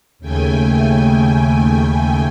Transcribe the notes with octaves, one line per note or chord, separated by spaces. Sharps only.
D#2 C#3 A3 G5 G#5